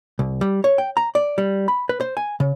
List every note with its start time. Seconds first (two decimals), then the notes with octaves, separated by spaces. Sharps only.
0.19 C2
0.41 G3
0.64 C#5
0.78 G5
0.97 A#5
1.15 D5
1.38 G3
1.68 B5
1.89 B4
2.01 C5
2.17 G#5
2.40 C#3